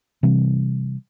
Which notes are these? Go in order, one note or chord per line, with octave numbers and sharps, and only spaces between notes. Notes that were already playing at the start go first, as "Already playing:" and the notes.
C3 E3 G3